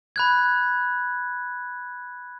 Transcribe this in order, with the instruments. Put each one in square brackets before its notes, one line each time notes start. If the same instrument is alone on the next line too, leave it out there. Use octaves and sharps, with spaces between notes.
[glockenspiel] B5 F#6 G#6